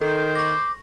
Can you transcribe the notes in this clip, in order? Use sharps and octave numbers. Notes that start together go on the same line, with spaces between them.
D#3 A4 C5
C#6 D6 A#6